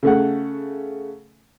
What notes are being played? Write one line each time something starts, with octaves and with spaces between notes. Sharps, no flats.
C#3 A3 F#5